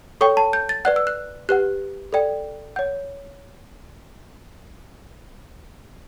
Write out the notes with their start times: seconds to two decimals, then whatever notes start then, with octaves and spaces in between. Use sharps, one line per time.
0.21 A4 C#5 G5 C#6
0.37 A5
0.53 G6
0.69 A6
0.85 B4 D5 F#5 F#6
0.96 E6
1.07 F#6
1.49 G4 B4 F#5 F#6
2.13 A4 D5 G5
2.76 C#5 F#5 G6